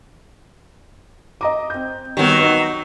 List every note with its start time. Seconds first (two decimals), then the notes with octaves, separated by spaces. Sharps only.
1.41 D#5 A#5 D6
1.70 C4 G6
2.17 D#3 F#3 G3 B3
2.40 D#4 B4